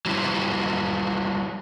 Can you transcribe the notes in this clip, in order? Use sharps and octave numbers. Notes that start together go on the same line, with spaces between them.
F#3 G3 E4 F4